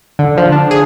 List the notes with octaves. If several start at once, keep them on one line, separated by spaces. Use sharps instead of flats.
D3
F3
D4
G#4